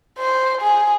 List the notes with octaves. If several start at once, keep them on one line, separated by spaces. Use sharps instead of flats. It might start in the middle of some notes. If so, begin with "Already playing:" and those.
C5
G#4